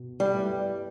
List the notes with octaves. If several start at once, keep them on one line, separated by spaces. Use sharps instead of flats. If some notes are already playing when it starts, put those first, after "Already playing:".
Already playing: B2
G3
A3 E4 G4 B4